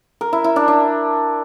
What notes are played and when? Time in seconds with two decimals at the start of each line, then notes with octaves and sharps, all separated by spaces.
0.21 A#4
0.33 E4
0.44 E4
0.56 D4
0.68 D4